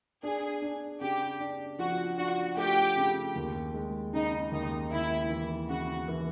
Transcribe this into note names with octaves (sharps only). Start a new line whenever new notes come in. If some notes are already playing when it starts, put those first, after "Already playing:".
D4 G#4
D4
C#3 G4
D4
F3 F#4
D4 F#4
A3 G4
C#3
D#2
G#3
C#3 D#4
D#2 D#4
D#2 E4
E3
C#3 F#4
E3